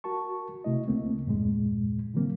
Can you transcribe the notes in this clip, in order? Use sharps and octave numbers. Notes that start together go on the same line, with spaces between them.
F#4 A#4 A5 C#6
C3 A3 E4 D#5
D2 C#3 A3 A#3 C4
E2 G2 A#2 G#3
D3 E3 F#3 A#3 C4